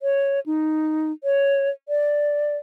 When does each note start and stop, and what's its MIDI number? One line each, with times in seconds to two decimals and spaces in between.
0.01 0.40 73
0.46 1.12 63
1.24 1.70 73
1.89 2.57 74